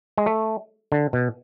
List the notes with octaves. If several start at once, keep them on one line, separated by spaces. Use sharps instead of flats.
G#3
A3
D3
B2